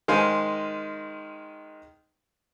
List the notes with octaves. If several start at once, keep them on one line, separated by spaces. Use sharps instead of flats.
D#3 G#3 C5 F5 G#5 C6